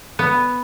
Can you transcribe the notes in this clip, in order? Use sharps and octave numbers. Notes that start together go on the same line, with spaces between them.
B3